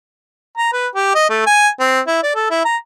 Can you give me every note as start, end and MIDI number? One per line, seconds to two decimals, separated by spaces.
0.58 0.71 82
0.73 0.88 71
0.95 1.11 67
1.15 1.26 75
1.29 1.44 57
1.47 1.68 80
1.80 2.01 60
2.07 2.18 64
2.23 2.34 74
2.35 2.49 69
2.50 2.64 64
2.65 2.77 82